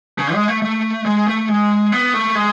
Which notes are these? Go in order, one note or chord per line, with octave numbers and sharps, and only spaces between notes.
C#3
G#3
A3
A3
G#3
A3
G#3
B3
A3
G#3